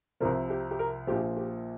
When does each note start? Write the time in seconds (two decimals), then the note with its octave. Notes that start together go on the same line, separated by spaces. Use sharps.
0.20 C2 C3 F3 A#4
0.50 G4
0.71 G4
0.79 A#4
1.07 A#1 A#2 F3 G4
1.37 G4